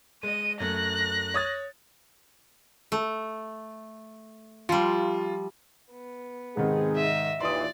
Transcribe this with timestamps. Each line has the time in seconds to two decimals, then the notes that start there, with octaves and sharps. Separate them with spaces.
0.23 G#3 D#5 D#7
0.60 F#2 A3 F#6 A#6
1.34 C#5 D#6 A6
2.92 A3
4.69 F3 G3 F4
5.91 B3
6.57 G#2 C3 D#3 C4 D#4 G#4
6.96 D#5 E5
7.41 D#2 A#2 E3 D5 C6 D#6